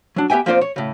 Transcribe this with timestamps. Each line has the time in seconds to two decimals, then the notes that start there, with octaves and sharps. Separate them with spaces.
0.16 F#3 D4
0.30 B3 G4 E5 G5 G#5
0.46 F3 A#3 C4 F4 C5 D5
0.61 C#5
0.76 A2 C#3